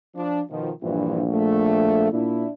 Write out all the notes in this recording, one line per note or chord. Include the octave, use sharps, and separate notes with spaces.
F3 D4
B2 D#3 F3
A#1 G2 E3 F3
A3
A#2 D4 E4